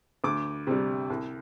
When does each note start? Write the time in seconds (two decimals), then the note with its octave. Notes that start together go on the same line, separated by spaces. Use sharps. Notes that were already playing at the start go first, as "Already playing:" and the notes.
0.24 D2 D6
0.67 C3 G3
1.10 C2